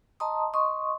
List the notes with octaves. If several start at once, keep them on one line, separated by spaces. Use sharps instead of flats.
D#5 A5 A#5 C6 D#6
D#5 C6 C#6 D#6